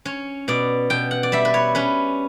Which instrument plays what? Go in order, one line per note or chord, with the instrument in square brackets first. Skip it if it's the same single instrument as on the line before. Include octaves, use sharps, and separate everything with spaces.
[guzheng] C#4 C#5
B2 D5
B2 G5
F#5
D5
G3 E5
B4
C#5
C#4 B4